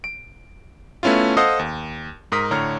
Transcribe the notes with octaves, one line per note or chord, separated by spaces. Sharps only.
D7
A3 B3 C#4 E4 F4
A4 C5 D#5 F5 F#5 D#6
D#2
G#2 A#4 D#6 B6
A2 D3 C#5 A#5 F6